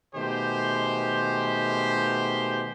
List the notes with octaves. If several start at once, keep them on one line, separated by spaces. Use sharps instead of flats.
B2 D#3 G#3 A3 G4 C5